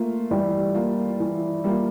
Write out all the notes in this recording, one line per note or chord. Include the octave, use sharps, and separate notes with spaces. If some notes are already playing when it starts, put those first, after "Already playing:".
Already playing: A3 A#3 F4
E3 G3
A#3 F4
E3
G3 A#3 F4